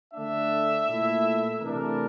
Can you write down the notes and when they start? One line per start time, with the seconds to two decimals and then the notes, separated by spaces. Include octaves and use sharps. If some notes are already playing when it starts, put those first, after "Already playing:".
0.14 D3 A3 D4 E5
0.88 A#2 A3 E4
1.60 C3 E3 A3 D4 A#4